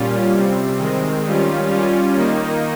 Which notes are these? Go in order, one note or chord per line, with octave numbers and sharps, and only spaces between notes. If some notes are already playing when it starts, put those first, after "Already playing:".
Already playing: A#2 G3 C#4 F4
C3 G3 C4
D#3 G#3 C4
D#3 G3 C#4 F4
G3 C#4 F4
D#3 A#3 D#4